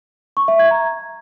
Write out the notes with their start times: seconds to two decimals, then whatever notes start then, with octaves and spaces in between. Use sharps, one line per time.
0.37 C#6
0.48 E5
0.59 G#6
0.71 A#5